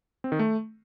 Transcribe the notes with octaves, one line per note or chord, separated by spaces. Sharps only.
C4
D#3
A3